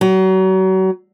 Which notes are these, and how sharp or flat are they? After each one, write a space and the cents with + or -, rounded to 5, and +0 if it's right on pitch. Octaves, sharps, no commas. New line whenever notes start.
F#3 +35